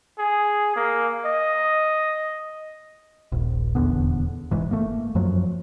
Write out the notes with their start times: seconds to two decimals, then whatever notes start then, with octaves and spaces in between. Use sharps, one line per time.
0.18 G#4
0.76 A#3
1.25 D#5
3.32 D#1 A#1
3.75 D#1 E2 D3 B3
4.51 F1 G#2 E3
4.71 A3 A#3
5.15 F#2 F3 F#3